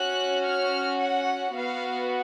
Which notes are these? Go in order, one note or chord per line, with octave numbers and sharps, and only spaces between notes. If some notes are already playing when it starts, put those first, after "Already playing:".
Already playing: C#4 F#4 F#6
F6
F#5
B3 F#4 F5